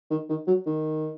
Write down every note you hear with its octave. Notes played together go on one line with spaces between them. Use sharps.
D#3
D#3
F#3
D#3